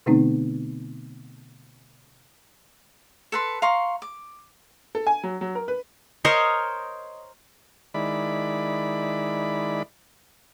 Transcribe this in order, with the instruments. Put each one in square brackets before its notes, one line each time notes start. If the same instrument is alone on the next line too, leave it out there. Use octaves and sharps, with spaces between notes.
[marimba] B2 D3 A3 B3 C4 D#4
[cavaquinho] A4 B4 C6
F5 A#5 C6 C#6
D6
[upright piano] A4
G#5
F#3
F#3
A#4
B4
[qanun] A#4 C5 C#5 D#5
[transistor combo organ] D#3 G#3 E4 D5 B5